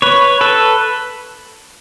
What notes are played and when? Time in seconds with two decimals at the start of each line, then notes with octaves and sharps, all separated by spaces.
0.02 B4 C#5
0.41 A4 B4